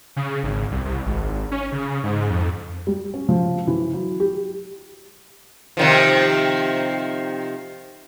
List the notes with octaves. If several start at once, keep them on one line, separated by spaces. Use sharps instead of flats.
C#3
G#1
C2
C2
G#1
C#4
C#3
G#2
F2
G3
C#4
F3
E3
F#3
G4
C3 D#3 F3